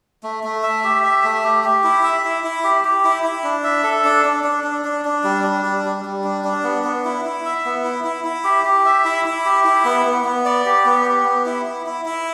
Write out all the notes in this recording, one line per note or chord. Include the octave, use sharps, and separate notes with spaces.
A3
A3
E5
G4
E5
A3
G4
G4
E4
E5
E4
E4
G4
G4
E4
E4
D4
E5
A4
D4
D4
D4
D4
D4
D4
G3
D4
G3
G3
G3
D4
D4
B3
B3
E4
E4
E5
B3
E4
E4
E4
G4
G4
E5
E4
E4
G4
E4
B3
B3
B3
D5
G4
B3
G4
B3
E4
E4
E4
E4